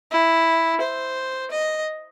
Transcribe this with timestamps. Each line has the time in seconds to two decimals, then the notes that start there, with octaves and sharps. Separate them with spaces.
0.11 E4
0.81 C5
1.51 D#5